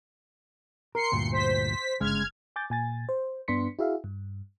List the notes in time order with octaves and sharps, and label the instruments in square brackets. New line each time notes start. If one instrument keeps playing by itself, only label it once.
[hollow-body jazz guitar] A#4 [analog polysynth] C6 C7 C#7
[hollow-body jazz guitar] D2 G2 A#2
[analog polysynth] C5 B6
[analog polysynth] G1 F6 G#6 [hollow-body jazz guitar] C#3 G#3
[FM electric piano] G#5 D6 G6 A6
A#2 G#5 A6
C5
G2 B3 D4 C6 B6 C#7
E4 F#4 G#4 E5 F5
G2